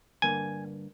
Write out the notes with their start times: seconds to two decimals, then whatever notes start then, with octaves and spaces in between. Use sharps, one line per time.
0.22 G2 D3 A#3 G#5